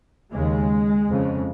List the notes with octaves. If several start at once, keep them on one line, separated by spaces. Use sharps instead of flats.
D#2 C#3 G#3
F2 C#3